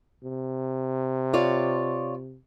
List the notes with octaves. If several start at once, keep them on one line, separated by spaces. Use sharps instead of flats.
C3
F4 C#5 D5